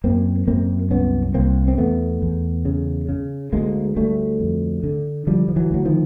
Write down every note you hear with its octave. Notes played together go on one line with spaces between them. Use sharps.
F#2 A#3 C4
F#2 A#3 C4
C2 B3 C#4
C2 A#3 C4
C4
E2 A3 B3
E2
C#3
C#3
D2 G#3 A#3
D2 G3 A3
F2
D3
D3 F3 G3
F3
E3 F#3
D2 F#3
D#3 F3